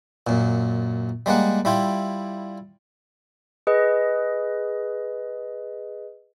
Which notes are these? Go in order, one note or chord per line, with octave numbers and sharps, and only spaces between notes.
F#2 A#2
G3 G#3 A#3 F#5
G3 E4 F4 G5
G#4 B4 D#5